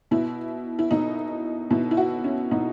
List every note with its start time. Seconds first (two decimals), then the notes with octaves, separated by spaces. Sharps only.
0.11 B2 E4
0.79 E4
0.91 B2 D#4
1.71 B2 E4
1.91 E4
1.97 F#4
2.24 C#4
2.51 B2 D#4